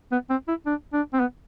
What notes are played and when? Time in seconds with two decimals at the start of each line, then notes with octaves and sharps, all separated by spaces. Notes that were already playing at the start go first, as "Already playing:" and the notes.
0.12 B3
0.30 C4
0.48 E4
0.66 D4
0.93 D4
1.14 C4
1.20 B3